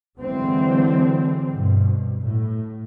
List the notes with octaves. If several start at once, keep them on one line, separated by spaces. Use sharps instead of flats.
D3 E3 F#3 G#3 C4
G2 B2
A2